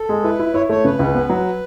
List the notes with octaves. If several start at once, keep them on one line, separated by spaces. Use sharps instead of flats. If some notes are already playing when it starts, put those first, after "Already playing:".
Already playing: A4
G#3
E4 B4
E4
E4 C#5
A3 C#5
C#3 B4
C#2
B3
F#3